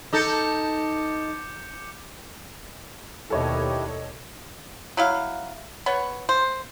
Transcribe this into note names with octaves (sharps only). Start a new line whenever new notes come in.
D#4 A4 D6 G6 C#7
D#2 B2 D4 E4 G4 A4 C#5 D#5
F#3 E4 F5
B3 C#5
C5